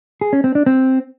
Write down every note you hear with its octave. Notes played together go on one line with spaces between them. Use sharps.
G#4
C#4
C4
D4
C4